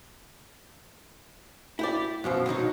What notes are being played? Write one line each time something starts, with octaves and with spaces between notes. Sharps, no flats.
E4 G4 D5
F#2 B2 F3
B2 D#3 F#3 D#4